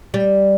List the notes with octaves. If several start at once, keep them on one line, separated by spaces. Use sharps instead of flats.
G3